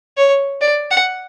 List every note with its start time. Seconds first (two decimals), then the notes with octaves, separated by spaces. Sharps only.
0.17 C#5
0.61 D5
0.91 F#5